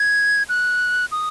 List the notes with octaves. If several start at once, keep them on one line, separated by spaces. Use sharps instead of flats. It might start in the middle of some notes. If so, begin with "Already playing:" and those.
Already playing: G#6
F#6
D#6